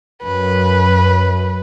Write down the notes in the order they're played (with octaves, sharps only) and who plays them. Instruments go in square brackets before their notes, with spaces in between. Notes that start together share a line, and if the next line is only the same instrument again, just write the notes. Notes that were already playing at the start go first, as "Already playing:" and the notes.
[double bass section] F#2 [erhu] B4